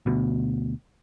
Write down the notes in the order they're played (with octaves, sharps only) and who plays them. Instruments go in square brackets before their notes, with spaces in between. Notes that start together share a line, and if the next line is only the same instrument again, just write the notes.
[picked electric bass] D2 B2